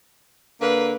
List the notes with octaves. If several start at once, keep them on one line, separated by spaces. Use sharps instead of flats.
D3 A#3 B4